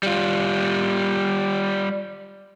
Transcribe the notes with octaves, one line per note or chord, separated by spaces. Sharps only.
G3 F4